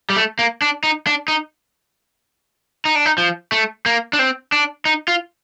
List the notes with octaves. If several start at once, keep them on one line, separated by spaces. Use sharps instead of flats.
G3
A3
A#3
D4
D#4
D4
D#4
D#4
D4
D#4
F3
A3
A#3
D4
C4
D4
D#4
F4